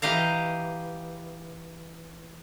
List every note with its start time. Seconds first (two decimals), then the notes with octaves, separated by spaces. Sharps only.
0.02 E3 G4 D#5 F5 A#5